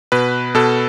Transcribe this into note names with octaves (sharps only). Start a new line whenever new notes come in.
B2 B4
B2 A4